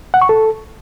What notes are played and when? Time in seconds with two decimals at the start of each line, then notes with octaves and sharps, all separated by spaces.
0.14 F#5
0.22 C#6
0.29 A4